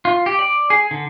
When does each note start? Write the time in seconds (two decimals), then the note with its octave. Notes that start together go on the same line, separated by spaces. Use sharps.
0.05 F4
0.26 G4
0.39 D5
0.70 G#4
0.91 D3